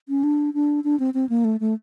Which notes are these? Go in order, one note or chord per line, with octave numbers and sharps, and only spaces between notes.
C#4
D4
D4
D4
C4
C4
A#3
A3
A3